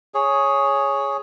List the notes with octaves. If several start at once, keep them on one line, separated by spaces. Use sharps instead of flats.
G#4 C#5